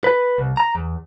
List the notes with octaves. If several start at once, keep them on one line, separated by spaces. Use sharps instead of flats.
B4
C2
A#5
E2